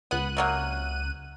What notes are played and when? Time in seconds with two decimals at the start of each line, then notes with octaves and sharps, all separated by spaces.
0.11 C#2 B3 F#6 D#7
0.37 C3 F#3 A#3